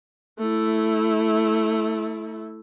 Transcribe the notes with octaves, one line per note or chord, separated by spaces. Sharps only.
A3 E4